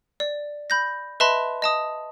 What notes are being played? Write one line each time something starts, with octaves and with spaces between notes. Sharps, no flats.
D5
B5 G6 A#6
B4 D#5 E5 A5 B5 C6
D#5 A5 D#6